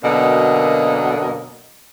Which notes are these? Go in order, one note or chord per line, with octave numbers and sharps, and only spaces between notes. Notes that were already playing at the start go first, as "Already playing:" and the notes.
F#2 B2 D3 A#3 D#5